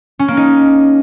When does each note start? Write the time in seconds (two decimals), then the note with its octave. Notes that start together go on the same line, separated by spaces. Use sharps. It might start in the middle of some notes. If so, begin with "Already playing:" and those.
0.19 C#4
0.28 A#3
0.37 D#4